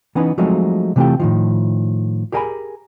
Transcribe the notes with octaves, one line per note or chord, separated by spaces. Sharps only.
E3 B3 C#4 D#4 B4
F3 F#3 G#3 A3 C4 D#4
C3 E3 A3 C4 F4 G4
A2 D#3 F3
G4 G#4 A#4 F#5 G#5 B5